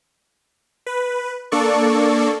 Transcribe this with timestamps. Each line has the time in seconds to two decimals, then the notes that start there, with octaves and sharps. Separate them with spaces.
0.86 B4
1.52 A#3 D4 A4 D5 C#6